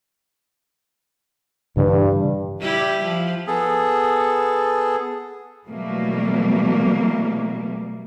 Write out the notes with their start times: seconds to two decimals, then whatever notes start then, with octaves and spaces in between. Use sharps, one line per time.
1.77 G2 A#2 C#3 E3
2.59 G3 E4 G4
3.03 F3
3.47 B3 G#4 A4
5.67 B2 E3 F#3 G3 A3 A#3